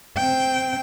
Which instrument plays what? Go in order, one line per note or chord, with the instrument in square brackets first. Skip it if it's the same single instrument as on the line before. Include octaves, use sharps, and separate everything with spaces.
[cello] C4 G5